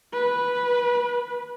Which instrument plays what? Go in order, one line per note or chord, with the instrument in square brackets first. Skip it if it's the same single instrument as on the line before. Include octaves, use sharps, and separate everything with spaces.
[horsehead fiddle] B4